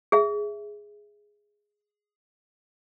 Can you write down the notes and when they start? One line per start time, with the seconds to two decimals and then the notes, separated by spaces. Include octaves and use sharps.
0.12 G#4 E5